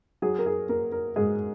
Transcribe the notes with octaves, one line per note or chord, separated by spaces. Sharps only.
F#3 G#4
A#4
G#4
A#3 A#4
A#4
G#2 G#4